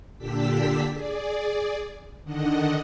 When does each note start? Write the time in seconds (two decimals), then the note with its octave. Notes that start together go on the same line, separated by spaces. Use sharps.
0.18 A#2 D3 D4 G4 E6 B6
0.91 G#4 D5
2.24 D3 D#3 D4 D#5 F#5